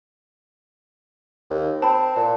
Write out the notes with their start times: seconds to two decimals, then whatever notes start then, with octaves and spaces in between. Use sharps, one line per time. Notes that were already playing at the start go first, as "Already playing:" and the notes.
1.50 D#2
1.82 C4 A5 B5
2.16 A#2 A5